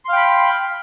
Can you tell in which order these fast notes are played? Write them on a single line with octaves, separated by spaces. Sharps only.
C6 F5 G5 B5